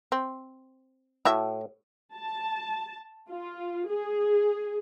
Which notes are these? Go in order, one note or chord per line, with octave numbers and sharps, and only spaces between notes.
C4
A2 E4 F#4 E5
A5
F4
G#4